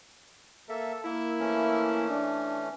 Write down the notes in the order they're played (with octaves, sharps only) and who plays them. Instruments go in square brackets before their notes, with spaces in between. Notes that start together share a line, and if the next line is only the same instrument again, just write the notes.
[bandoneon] A#3 E5 [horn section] A4
[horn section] A#3 E4 [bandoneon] E5
[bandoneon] E3 A3 C#4
[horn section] D4